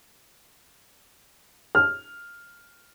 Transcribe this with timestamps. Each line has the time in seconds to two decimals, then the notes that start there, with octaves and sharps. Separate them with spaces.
1.75 F6